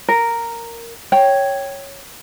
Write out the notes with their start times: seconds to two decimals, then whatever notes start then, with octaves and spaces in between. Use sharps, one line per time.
0.08 A#4
1.12 C#5 G5